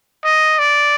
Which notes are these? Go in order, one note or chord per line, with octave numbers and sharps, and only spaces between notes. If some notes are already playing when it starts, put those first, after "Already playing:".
D#5
D5